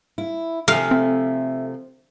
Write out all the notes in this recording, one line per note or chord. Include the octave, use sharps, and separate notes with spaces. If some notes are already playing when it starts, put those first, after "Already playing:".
E4
C3 F3 A3 A4 E5 F5 G#5
C4